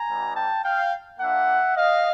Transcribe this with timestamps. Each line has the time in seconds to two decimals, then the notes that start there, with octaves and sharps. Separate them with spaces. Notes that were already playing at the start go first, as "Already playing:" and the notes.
Already playing: G#5 A#5
0.09 G3 B3 D#4 G4
0.36 G5 A5
0.64 F5 G5
1.20 A#3 D4 F4 E5 F#5
1.76 D#5 F5